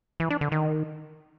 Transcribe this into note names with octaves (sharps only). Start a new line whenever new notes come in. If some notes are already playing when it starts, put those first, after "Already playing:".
E3
D4
D3
D#3